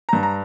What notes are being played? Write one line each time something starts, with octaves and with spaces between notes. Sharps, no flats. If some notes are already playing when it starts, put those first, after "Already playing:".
G2 A#5
A#5